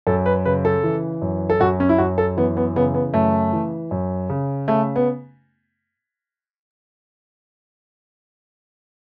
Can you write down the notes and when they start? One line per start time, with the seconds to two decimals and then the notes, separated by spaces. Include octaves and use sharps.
0.07 F#2 A4
0.26 B4
0.45 C#3 B4
0.65 A4
0.83 E3
1.22 F#2
1.50 A4
1.60 F#2 F#4
1.80 C#4
1.89 E4
1.98 F#2 F#4
2.18 A4
2.37 E3 B3
2.57 B3
2.76 C#3 B3
2.94 B3
3.14 F#2 A3
3.53 E3
3.91 F#2
4.29 C#3
4.68 C#3 A3
4.96 B3